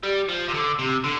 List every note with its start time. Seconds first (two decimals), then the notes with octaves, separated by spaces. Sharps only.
0.04 G3
0.29 F3
0.48 C3
0.54 D3
0.79 C3
1.04 D3